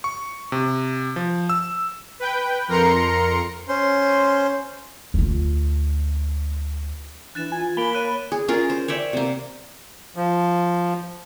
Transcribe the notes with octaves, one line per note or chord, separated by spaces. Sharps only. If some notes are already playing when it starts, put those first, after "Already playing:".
C#6
C3
F3
E6
B4 G5
F2 A#4 A#5 C6 C#7
C#4 C5 C6
D2 F4
E3 D4 F#6 A6 E7
F4 G#5
A#3 B5 D7 F7 G7
C#5 F#6 D#7
G#4
C#4 F4 G#4 A#4
C5
C#5 D5 E5 G5
C3 A#3
F3